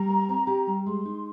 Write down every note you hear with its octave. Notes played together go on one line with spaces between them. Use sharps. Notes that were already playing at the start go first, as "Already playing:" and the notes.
Already playing: G3 A#5
A#3
C4
G4
G3
G#3 C6
D#4